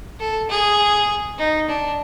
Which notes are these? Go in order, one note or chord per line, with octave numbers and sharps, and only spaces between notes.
A4
G#4
D#4
D4